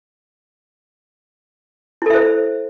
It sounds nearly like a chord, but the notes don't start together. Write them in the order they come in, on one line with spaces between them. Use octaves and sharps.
E4 A4 E5 C5